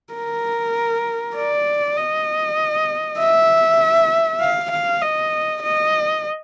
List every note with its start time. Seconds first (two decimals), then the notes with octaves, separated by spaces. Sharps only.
0.14 A#4
1.36 D5
1.97 D#5
3.19 E5
4.41 F5
4.71 F5
5.02 D#5
5.62 D#5